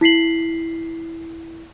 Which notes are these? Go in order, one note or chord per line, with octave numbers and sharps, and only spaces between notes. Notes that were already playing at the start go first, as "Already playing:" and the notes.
E4 B6 C7 F#7